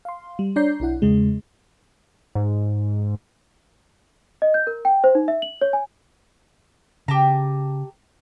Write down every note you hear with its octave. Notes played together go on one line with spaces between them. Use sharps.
F5 C6
G3
D4 C#5 D5 A#5 G6 C7
B1 D4 E4 F#5
E2 C#3 G#3
G#2
D#5
G6
A#4
G5
C5
D#4
E5
F#7
C#5
G#5
C#3 G4 A5 A#5